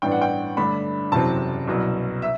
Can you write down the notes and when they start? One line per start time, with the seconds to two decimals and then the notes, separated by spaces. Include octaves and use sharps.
0.02 A1 G2 E3 B3 D4 G5
0.12 F#5
0.22 G5
0.57 G2 D3 A3 D4 B5
1.12 F#1 E2 C3 F#3 C4 A5
1.67 C2 B2 F#3
2.22 E5